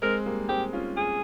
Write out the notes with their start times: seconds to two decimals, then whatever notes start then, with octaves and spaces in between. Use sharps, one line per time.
0.02 G#3 C4 A#4
0.26 G3 A#3
0.48 G#3 C4 G4
0.73 C#4 F4
0.97 G#4